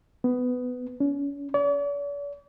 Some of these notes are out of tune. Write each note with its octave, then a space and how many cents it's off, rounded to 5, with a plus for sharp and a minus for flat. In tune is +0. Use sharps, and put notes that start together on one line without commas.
B3 +15
C#4 +35
D5 -45